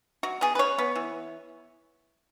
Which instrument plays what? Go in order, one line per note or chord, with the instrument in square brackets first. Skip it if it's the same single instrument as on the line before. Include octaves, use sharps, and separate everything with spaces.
[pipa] F#3 F#4
B3 G#4
B4
C#3 C#5
B3
E3